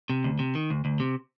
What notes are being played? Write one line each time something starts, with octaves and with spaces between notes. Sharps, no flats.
C3
D2
C3
D#3
D2
D2
C3